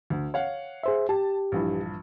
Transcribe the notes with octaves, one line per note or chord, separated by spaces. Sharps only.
D2
C#5 F5 F#5
G#4 C5 E5
G4 A5
A#1 G2 E3